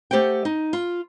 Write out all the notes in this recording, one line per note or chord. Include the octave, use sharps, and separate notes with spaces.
A3 G4 C5 F#5 G5
D#4
F4